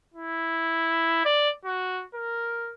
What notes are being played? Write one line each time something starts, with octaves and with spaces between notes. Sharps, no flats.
E4
D5
F#4
A#4